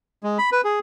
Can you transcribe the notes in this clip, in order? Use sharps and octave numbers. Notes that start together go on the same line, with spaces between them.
G#3
B5
B4
G#4